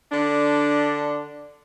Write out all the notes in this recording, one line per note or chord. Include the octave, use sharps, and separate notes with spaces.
D3 D4